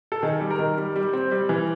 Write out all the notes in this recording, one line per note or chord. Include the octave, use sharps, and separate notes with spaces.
A4
D#3 G#4
G3
A#4
D#3
G3
G3
C4
G3
E3